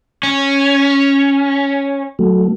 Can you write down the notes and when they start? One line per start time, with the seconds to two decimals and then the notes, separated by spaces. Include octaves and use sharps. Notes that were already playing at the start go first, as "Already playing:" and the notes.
0.23 C#4
2.19 F#3 A3